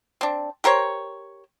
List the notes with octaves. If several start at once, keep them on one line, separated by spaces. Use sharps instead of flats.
C4 D4
G4 A#4 C5 C#5